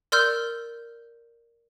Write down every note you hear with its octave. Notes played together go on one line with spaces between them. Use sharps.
A#4 D5 C6 E6 F6 G6